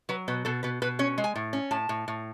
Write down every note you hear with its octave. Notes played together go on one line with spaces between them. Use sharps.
F#3 B4
B2 B4
B2 A4
B2 B4
B2 B4
C#4 C#5
G#3
G#5
A2
C#4
A2 A5
A2
A2